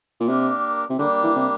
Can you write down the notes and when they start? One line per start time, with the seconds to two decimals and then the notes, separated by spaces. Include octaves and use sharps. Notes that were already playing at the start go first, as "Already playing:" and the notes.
0.20 A#2
0.27 C3 A#3 D4 G4 A#4
0.90 C3
0.98 D3 G3 A#3 D4 G4
1.23 E3
1.36 C3